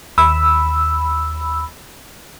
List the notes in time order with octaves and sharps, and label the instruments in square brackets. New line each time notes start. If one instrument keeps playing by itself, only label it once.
[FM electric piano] D#2 B5 E6